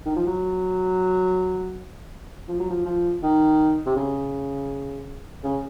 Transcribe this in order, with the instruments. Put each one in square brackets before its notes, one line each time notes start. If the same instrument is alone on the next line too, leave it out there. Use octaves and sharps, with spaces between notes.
[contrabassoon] D#3
F3
F#3
F3
F#3
F3
F3
D#3
C3
C#3
C#3